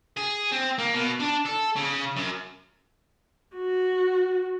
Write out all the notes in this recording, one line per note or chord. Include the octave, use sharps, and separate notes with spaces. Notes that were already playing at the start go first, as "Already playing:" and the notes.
G#4
C4
A#3
B2
D4
A4
C#3
F#2
F#4